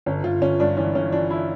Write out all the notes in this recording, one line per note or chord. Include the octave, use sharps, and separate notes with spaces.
G1 C#4
G1 F4
G1 C#4
G2 D4
E3 C#4
G1 C#4
E3 D4
E4